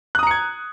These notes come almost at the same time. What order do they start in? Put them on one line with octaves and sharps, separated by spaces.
F#6 D#6 A#5 C#7 G#6